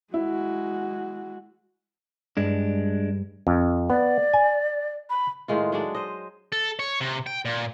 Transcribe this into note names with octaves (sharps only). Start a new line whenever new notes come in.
G#3 E4 F#4
G2 G#3 D4
F2
B3 D5
G#5
B5
A2 D#3 G#3 F4
F#3 G#3 D4
C5 D#5
A4
C#5
C3
G5
A#2